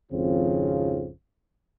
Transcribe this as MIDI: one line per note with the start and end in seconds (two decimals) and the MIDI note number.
0.12 1.10 32
0.12 1.10 41
0.12 1.10 49
0.12 1.10 53
0.12 1.10 60
0.12 1.10 65